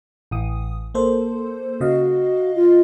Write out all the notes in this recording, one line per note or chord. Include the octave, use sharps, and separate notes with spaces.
A1 E3 D#6
A#3 A4 C5
C#3 F#4 D#5 F5
F4